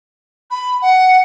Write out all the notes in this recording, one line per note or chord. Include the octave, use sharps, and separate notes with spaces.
B5
F#5